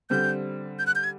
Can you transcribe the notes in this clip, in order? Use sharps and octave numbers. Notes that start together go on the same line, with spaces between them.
D3 G3 C4 G6
G6
F#6
G6
G#6